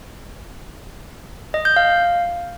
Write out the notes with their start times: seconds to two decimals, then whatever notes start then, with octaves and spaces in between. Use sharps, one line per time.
1.54 D#5
1.65 G6
1.76 F5